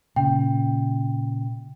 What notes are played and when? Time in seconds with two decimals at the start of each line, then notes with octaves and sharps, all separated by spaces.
0.16 A#2 C#3 G5